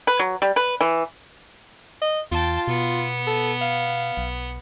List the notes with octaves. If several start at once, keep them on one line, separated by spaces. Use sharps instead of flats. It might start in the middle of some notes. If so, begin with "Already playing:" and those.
B4
F#3
G3
B4
E3
D#5
E2 F4 G5 A5
B2 B3
A4
F5
B1